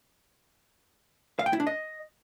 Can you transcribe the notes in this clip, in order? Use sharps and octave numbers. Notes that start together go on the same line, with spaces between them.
F5
G5
E4
D4
D#5